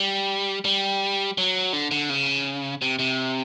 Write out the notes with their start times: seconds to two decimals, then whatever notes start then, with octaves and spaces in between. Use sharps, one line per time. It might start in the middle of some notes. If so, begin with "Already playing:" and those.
Already playing: G3
0.65 G3
1.38 F#3
1.73 D3
1.91 D3
2.09 C#3
2.82 C3
2.99 C3